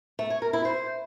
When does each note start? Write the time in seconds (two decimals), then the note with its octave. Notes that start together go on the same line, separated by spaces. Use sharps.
0.19 A3
0.30 C#5
0.42 A#4
0.53 E4
0.65 C5